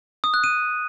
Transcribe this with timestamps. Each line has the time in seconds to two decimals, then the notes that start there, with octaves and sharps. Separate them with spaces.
0.24 D#6
0.34 F#6
0.44 D#7